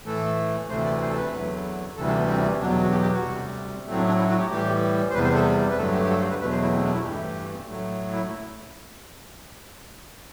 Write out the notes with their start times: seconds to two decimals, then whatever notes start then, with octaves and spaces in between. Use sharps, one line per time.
0.06 A2 E3 A3 A4
0.69 D2 C3 E3 A3 C5
0.85 D5
1.01 C5
1.10 A4
1.17 B4
1.32 E2 D3 F#3 A3
1.96 D2 C3 E3 G3 A4
2.07 D4
2.18 B3
2.28 C4
2.60 E2 B2 F#3 D4
2.82 F#4
2.91 G4
3.02 G4
3.13 F#4
3.24 D2 C3 G3
3.86 A2 F#3 A3 C4
3.97 D4
4.08 D4
4.19 E4
4.29 F#4
4.40 G4
4.50 A2 E3 G3 G4
5.10 C5
5.13 E2 C3 G3 B4
5.24 C5
5.35 A4
5.70 B4
5.77 G2 D3 F#3 A3 A4
5.93 G4
6.04 G4
6.10 A4
6.20 C5
6.30 B4
6.41 E2 B2 F#3 A3 B4
6.51 C5
6.62 E4
6.73 C4
6.84 D4
6.94 E4
7.04 G2 E3 A3 G4
7.67 A2 F#3 A3
8.13 E4